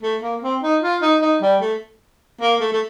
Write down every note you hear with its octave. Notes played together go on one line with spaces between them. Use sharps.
A3
A#3
C4
D#4
F4
D#4
D#4
G3
A3
A#3
A3
A3